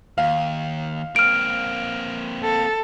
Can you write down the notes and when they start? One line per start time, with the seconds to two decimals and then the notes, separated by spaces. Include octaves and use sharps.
0.18 D#2 F5
1.16 A#3 C4 F6 D7
2.43 A4